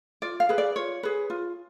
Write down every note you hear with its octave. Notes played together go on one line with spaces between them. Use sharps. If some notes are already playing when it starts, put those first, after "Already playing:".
F4 D5
F5
G#4 B4
D5
F4 C#5
G#4 B4
F4